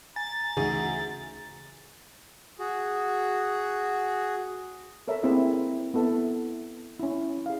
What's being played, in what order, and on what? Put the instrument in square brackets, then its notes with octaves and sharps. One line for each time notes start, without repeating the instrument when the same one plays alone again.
[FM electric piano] G#5 [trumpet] A#5 [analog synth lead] A6
[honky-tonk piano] D2 G#4 [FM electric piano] C#3 E3 D#4
[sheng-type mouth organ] F#4 G#4
[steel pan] A4 A#4 C#5 E5 A#5
A#3 C4 E4 G#4 A#4 E5
B3 E4 A4 E5
C#4 E4
G#4 F5